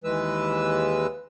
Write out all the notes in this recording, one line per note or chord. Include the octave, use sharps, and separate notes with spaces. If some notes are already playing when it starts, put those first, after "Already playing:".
D#2 E3 G#3 B4 E6